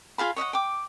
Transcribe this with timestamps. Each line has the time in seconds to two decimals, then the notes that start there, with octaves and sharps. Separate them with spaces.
0.18 F4 G#4 F5 B5
0.36 C#5 D#5 E5 F#5
0.53 G5 D6